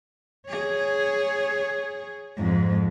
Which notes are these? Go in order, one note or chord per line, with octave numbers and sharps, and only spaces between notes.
G#4 C#5
F2 G#2